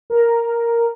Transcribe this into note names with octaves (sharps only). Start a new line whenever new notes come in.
A#4